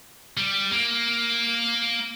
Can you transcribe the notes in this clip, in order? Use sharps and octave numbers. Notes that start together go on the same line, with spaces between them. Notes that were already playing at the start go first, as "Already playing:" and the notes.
G3
A#3